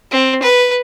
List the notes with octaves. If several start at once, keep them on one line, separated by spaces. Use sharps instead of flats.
C4
B4